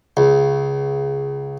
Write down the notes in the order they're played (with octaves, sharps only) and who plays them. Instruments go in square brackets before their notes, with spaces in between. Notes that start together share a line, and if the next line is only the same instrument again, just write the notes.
[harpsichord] C#2